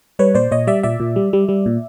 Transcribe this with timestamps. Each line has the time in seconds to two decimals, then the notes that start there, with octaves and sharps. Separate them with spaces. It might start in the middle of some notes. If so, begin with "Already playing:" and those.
0.19 G3 B4 C#5
0.34 A#2 C5 D5
0.51 A#2 C#5 D#5
0.67 G3 D5 E5
0.83 A#2 D5 E5
1.00 A#2
1.16 G3
1.33 G3
1.49 G3
1.66 A#2